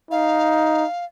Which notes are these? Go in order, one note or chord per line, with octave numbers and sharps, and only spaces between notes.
D#4 F5